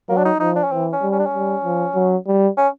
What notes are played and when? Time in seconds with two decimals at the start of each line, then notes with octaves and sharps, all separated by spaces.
0.09 F#3 A#3
0.17 D4
0.25 D#4
0.40 F3 D#4
0.56 D4
0.64 C#4
0.71 E3 C4
0.93 C#4
1.02 G3
1.12 C#4
1.19 D4
1.26 C#4
1.34 G3
1.64 F3
1.95 F#3
2.27 G3
2.57 C#4